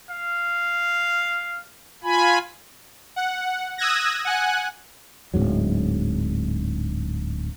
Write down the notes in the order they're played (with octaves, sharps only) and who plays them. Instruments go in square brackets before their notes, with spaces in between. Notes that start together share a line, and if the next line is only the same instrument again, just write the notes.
[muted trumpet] F5
[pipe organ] F4 G#5 B5
[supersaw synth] F#5
D#6 E6 F#6 G#6 A#6
F#5 G#5 F#6
[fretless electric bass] D1 C#2 G#2 F#3